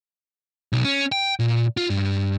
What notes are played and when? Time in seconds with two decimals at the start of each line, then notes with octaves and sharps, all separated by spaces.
0.73 B1
0.85 C#4
1.12 G5
1.40 A#2
1.77 F4
1.90 G2